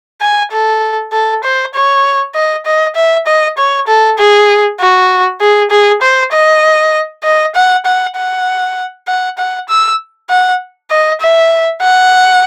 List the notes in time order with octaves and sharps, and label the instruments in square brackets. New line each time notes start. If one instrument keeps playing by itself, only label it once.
[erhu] G#5
A4
A4
C5
C#5
D#5
D#5
E5
D#5
C#5
A4
G#4
F#4
G#4
G#4
C5
D#5
D#5
F#5
F#5
F#5
F#5
F#5
E6
F#5
D#5
E5
F#5